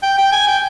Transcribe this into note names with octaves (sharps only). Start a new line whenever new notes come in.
G5
G5
G#5
G5